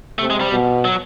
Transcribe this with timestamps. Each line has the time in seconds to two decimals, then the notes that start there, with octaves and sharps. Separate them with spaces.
0.19 C3 A3
0.30 G#3
0.41 G3
0.51 B2
0.85 F#3